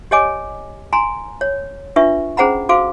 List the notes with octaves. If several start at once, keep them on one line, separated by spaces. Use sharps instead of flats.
G4 C#5 D#5 G#5 D6
G#5 A#5 C6
C#5
D4 F4 B4 E5 C#6
C#4 G#4 C5 F#5 A#5 B5
F#4 A4 C5 F5 D6